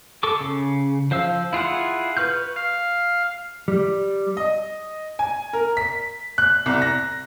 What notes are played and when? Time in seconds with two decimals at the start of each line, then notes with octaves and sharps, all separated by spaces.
0.23 A4 C#6 D6
0.41 C#3
1.11 F3 C5 F5 E6
1.53 E4 F4 G#4 F#5
2.17 B4 C#6 F6 G6
2.56 F5
3.68 G3
4.37 D#5
5.19 G#5
5.53 A#4
5.77 B6
6.38 F#6
6.66 C2
6.82 A#6